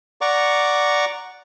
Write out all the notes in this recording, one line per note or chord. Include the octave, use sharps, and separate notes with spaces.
D5 F#5 A#5 C#6 D6